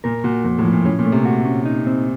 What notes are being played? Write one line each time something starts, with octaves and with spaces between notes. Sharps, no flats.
A#2 A#4
A#2 F#4
F2 A#2
A2
F3
A#2
A2 C#4
A#2
A3
C3
F#4
C#4
D#4
C4